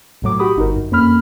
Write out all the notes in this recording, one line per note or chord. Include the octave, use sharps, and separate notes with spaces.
B1 A2 F#3 D6
F#4 G4 B5 D#6
G1 D#4 F#4 A#4
F#2
F2 A#3 C#4 B5 F6